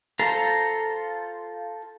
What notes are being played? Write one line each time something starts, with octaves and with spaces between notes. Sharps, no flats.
F4 A4 C5 A#5